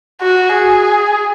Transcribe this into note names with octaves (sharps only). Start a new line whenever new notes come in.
F#4
G#4